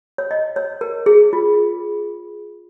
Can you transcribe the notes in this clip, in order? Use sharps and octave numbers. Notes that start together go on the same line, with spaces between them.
C#5
D#5
C#5
A#4
G#4
F4